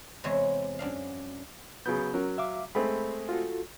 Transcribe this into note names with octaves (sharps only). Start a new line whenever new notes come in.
E2 C3 G#3 C#5 E5
F#2 D4 F5
C#3 F#3 B3 G6
F#3 C#4 A#4
E5 F5 D6
G#3 A3 C4 B5
F4 F#4 A4